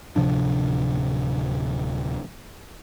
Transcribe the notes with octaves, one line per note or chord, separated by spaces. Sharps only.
D1 C3 F3 D4